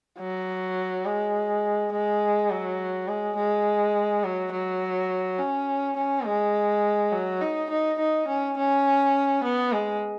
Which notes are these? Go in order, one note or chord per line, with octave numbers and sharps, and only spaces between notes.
F#3
G#3
G#3
F#3
G#3
G#3
F#3
F#3
C#4
C#4
G#3
F#3
D#4
D#4
D#4
C#4
C#4
B3
G#3